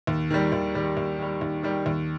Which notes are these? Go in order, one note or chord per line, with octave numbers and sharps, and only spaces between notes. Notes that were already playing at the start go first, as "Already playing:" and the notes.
D#2
D#3 G3
D#2
D#3 G3
D#2
D#3 G3
D#2
D#3 G3
D#2